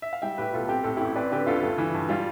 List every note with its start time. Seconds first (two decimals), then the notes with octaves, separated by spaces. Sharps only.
0.02 E5
0.13 F5
0.22 G3 E5 G5
0.38 A2 G4 B4
0.54 B1 F4 A4
0.69 C4 G4
0.84 A2 A4
0.97 A1 E4 G4
1.16 C4 B4 D5
1.31 D3 G4 B4
1.47 D2 F4 A4
1.63 G2
1.78 E3
1.95 G2
2.09 G3 F4